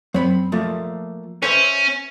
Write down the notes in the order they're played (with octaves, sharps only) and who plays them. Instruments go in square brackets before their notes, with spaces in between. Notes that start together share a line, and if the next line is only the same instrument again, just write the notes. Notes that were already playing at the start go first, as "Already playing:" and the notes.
[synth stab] F#2 [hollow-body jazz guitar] C4 B5
[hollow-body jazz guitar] F3 A3 A#3
[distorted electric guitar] C#4 [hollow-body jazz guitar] B4 C5 E5